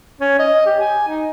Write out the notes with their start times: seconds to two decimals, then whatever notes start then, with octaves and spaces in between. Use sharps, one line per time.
0.21 C#4
0.39 D#5
0.66 G4
0.80 G#5
1.08 D#4